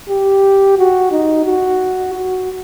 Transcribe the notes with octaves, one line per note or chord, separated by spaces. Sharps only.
G4
F#4
D#4
F#4
F#4